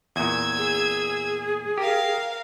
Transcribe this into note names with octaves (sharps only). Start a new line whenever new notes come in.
E2 A#2 E6 G#6
G#4
G4 A#4 F5